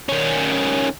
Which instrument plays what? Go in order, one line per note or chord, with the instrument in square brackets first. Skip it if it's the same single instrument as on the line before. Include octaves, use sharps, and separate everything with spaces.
[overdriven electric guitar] D#3 C#4